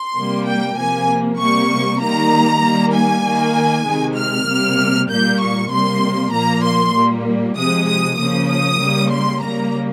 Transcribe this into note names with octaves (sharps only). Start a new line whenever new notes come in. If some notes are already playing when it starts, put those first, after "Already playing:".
Already playing: C6
C3 G3 A#3
G5
C3 F3 A#3 G#5
C3 G3 A#3 C#6
D#3 G3 A#3 A#5
D#3 G3 A#3
G#5
D#3 A#3
C3 D#3 G#3
F6
C3 G3 A#3
A#2 G3 A#3 G6
C#6
C3 G3 A#3 C6
A#2 F3 A#3 A#5
C6
A#2 G3 A#3
C3 F3 G#3 D#6
D#6
C#3 F3 A#3 D#6
D#6
C#3 G3 A#3
C6
C#3 G3 A#3 A#5